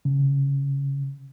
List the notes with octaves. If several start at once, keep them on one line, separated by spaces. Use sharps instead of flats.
C#3